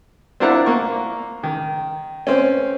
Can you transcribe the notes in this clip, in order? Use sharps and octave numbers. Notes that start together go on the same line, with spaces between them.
C4 D4 E4 F4 A#4 F#5
A#3 C#6
D#3
C4 C#4